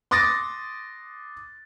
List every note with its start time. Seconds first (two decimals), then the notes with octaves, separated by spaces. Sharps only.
0.11 C6 D6 D#6 A6 A#6